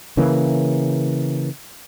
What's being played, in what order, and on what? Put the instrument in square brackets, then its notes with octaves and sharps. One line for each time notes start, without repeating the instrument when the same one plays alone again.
[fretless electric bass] C#3 E3 A#3